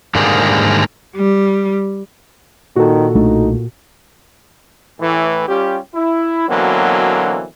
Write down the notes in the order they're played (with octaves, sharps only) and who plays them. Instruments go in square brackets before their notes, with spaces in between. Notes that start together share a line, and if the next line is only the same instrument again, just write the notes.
[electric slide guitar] G#2 D3 D#3 G3 A#3 G#4
[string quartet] G3
[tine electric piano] A#2 [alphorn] D#3 [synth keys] F#4 A4
[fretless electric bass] B1 A3 D4 [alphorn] D#4
[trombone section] A2 E3
G3 C#4 F4 G4
E4
B2 D3 E3 F#3 A#3 C4